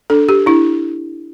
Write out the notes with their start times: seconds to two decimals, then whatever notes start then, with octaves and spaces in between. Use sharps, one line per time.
0.10 D4 A4
0.29 G4
0.46 D4 E4